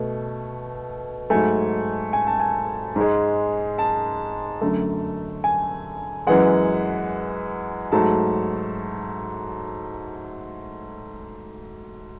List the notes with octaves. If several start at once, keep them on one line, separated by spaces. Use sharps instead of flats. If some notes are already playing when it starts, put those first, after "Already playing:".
Already playing: B2 A3
G#2 F#3 A3 G#5
G#5
A5
G#5
G#2 G#3
A5
F#2 D3 A3
G#5
F#2 E3 G#3 F#5
G#2 F#3 A3 A5